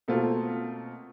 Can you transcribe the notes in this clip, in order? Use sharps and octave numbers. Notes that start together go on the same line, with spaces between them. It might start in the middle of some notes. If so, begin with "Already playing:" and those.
B2 A3 A#3 C4 F4 F#4